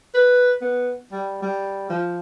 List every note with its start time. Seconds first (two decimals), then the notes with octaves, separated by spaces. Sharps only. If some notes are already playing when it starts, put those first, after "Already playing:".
0.15 B4
0.62 B3
1.12 G3
1.42 G3
1.90 F3